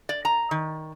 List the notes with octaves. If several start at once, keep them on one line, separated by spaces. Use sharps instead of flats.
D5
A#5
D#3